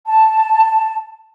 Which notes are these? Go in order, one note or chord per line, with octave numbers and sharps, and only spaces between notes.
A5